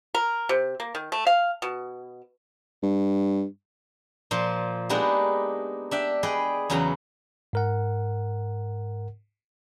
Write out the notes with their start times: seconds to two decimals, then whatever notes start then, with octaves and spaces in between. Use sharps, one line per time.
0.15 A#4
0.49 C3
0.80 A#3
0.95 D#3
1.12 A3
1.27 F5
1.62 B2
2.83 G2
4.31 A#2 F3 C5
4.89 G#3 A#3 B3 D4 D#4 G4
5.91 D4 E5 G5
6.23 G#4 B4 D5 D#5 G5
6.70 E2 C#3 F#3 B3 A#5
7.53 G#2 A#4 F#5